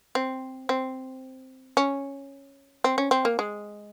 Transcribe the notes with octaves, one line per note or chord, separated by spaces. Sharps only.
C4
C4
C#4
C4
C#4
C4
A#3
G#3